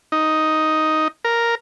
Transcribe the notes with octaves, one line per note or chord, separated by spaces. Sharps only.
D#4
A#4